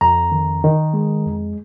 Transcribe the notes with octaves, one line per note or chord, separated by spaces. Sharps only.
F2 A#5
D#3
D#3
G#3
F2